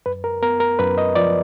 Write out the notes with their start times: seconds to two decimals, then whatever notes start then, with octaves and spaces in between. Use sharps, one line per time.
0.06 F#2 B4
0.24 A#4
0.42 B3 A#4
0.60 A#4
0.79 F#2 B4
0.98 D#5
1.15 F3 D5